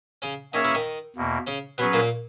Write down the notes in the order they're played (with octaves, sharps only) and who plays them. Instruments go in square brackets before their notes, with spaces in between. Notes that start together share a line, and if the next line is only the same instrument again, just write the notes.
[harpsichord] C#3 C#4
[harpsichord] D#3 D#4 [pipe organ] A#3 C#4 G#4 C#5 E5
[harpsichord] E3 E4
D#3 D#4
[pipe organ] E2 B2 A#3
[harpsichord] C#3 C#4
[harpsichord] B2 B3 [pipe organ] F#3 C#4 G#4 B4
[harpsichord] A#2 A#3